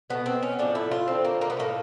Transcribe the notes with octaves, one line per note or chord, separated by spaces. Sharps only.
B2 F#3 A3 B3
C4
C#4
A2 F3 A3 D4
E4
F4
D3 F3 A3 C4
A#3
A#3
B3
A2 F#3 A3 A#3